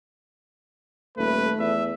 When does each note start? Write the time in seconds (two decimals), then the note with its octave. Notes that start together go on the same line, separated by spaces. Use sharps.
1.18 D#1 A3 B4
1.59 E2 E5